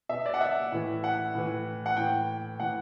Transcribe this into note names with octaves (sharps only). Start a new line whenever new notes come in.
B2 E5
D5
F#5
E5
A2 E3
F#5
A2 E3
F#5
A2 E3 G5
A2 E3 F#5